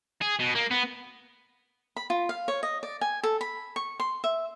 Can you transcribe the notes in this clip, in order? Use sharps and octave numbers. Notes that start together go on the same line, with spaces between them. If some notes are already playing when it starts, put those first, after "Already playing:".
G#4
B2
A#3
B3
B5
F4
F5
C#5
D#5
D5
G#5
A4
B5
C#6
C6
E5